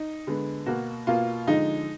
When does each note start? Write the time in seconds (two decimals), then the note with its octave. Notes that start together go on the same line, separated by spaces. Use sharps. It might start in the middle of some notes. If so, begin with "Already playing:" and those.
Already playing: D#4
0.27 D3 G#3 B3
0.66 B2 A#3 F#4
1.07 B2 A#3 F4
1.47 D3 F3 G#3 D#4